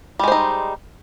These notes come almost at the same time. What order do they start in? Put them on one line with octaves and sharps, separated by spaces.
G3 G#3 C5 D#4